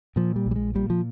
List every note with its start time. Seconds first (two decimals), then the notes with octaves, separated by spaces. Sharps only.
0.16 A#2 F3
0.36 G3
0.46 A#1
0.51 G3
0.56 G#3
0.75 A#2 G3
0.90 F3